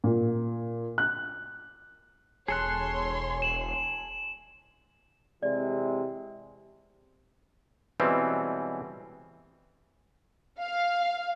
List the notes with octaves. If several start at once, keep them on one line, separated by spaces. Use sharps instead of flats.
A#2
F#6
E1 G#4 A4 C#5 C6 F#6
E7 F#7
C3 E3 G#3 D5
B2 E3 G3 G#3 C4 C#4
F5